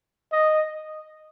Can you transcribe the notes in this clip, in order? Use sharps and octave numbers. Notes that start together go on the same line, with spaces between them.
D#5